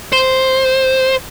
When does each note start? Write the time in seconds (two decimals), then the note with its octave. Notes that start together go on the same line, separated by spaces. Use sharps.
0.13 C5